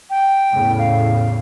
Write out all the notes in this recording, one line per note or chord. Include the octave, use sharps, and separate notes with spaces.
G5
E2 A2 C#3
F5